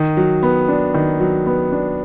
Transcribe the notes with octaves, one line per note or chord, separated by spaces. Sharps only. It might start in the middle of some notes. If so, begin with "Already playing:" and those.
Already playing: D#3
F#3
B3
D4
D#3
F#3
B3
D4